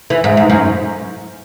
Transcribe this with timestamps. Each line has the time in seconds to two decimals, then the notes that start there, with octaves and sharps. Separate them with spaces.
0.10 E3
0.24 G#2
0.37 G#2
0.50 F#2